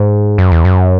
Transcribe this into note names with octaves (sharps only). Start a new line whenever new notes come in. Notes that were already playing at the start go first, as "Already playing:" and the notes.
Already playing: G#2
F#2
E2
F#2